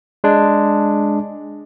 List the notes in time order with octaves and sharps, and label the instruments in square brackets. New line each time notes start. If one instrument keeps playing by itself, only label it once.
[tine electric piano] G#3 D4